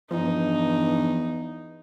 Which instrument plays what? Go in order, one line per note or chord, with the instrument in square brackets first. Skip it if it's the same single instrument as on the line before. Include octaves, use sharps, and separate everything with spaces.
[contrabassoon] E2 [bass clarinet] G2 [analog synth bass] F3 [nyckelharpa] D#4